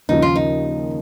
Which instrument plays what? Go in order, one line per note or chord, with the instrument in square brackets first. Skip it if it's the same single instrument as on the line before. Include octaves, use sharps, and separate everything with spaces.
[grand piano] D#2 C#3 F3 [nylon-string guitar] D#4
[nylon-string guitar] F4
D#4